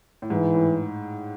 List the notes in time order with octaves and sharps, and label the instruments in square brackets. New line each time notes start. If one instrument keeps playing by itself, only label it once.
[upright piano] A2
[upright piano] G#2 [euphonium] E3
[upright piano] A2